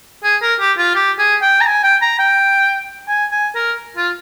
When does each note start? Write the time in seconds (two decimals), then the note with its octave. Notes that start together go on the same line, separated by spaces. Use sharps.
0.24 G#4
0.42 A#4
0.60 G4
0.78 F4
0.95 G4
1.19 G#4
1.42 G5
1.61 A#5
1.66 G#5
1.84 G5
2.02 A#5
2.19 G5
3.08 G#5
3.31 G#5
3.55 A#4
3.97 F4